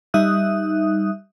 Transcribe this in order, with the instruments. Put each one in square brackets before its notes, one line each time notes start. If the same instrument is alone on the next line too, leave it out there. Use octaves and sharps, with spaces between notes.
[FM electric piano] G3 D#4 E5 D#6 F#6